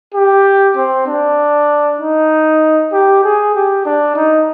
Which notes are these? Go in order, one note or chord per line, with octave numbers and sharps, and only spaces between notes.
G4
C4
D4
D#4
G4
G#4
G4
D4
D#4